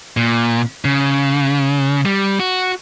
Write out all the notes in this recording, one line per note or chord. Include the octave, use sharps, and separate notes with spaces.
A#2
C#3
G3
F#4